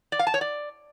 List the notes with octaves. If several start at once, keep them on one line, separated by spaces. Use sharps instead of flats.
D5
F5
A5
C#5
D5